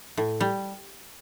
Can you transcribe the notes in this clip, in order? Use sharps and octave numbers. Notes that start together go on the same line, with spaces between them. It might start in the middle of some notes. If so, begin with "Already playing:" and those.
A2
G3